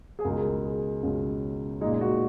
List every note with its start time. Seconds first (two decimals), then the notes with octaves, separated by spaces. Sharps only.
0.19 G#4
0.24 C#2 B2 G#3 A#4
0.64 G#4
1.03 C#2 B2 G#3 C#4
1.81 G#3 D#4
1.85 A#2
2.01 F#4